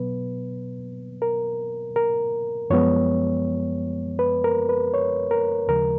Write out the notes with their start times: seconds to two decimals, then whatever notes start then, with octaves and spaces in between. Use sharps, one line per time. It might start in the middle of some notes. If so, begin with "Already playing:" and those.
Already playing: B2 F#3 B3 B4
1.22 A#4
1.96 A#4
2.70 F#2 F3 G#3 B3 C#5
4.19 B4
4.44 A#4
4.69 B4
4.94 C#5
5.31 A#4
5.68 D#2 C#3 F3 G#3 A#4